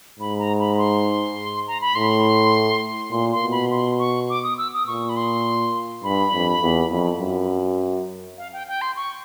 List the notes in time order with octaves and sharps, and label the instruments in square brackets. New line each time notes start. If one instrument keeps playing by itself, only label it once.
[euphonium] G#2 [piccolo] B5
[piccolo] A#5
B5
C6
A#5
B5
[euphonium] A2 [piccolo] C6
[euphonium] A#2 [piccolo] C6
[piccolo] C6
[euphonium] B2
[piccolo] B5
C6
C#6
D6
D#6
E6
D#6
[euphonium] A#2 [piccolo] C#6
[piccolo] B5
C6
[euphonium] G2 [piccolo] B5
[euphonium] F2
E2
F2
F#2
[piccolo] F5
G5
G5
C6
C#6